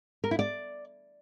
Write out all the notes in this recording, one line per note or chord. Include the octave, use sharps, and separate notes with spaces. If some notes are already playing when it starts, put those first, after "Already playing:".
A#4
E4
D5